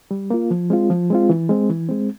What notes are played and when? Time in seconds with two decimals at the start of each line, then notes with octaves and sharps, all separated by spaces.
0.11 G3
0.30 A#3 F4
0.51 F3
0.70 G#3 C4 F4
0.90 F3
1.10 G#3 C4 F4
1.29 E3
1.49 G#3 C4
1.69 E3
1.89 G#3 C4